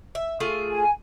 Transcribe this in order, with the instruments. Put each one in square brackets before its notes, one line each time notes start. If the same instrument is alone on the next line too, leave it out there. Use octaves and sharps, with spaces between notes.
[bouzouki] E5
A3 F4 G#4
[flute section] G#5